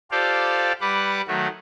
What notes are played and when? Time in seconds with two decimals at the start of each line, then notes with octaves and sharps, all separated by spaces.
0.11 F4 G4 A4 C5 D5 F5
0.81 G3 B4 F#5 D6
1.28 D#3 F#3 A3 F#4